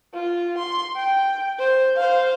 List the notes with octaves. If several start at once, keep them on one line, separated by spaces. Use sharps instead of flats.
F4
C6
G5
C5
C5 F5